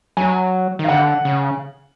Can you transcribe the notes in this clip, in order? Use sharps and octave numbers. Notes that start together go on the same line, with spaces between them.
F#3 G#5
D#3
F5
D3 F#5
C#3